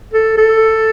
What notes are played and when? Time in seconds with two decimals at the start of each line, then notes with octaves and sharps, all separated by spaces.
0.13 A4
0.38 A4